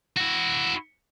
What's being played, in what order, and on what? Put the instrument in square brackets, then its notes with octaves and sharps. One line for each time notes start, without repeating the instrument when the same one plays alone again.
[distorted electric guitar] E4 F#4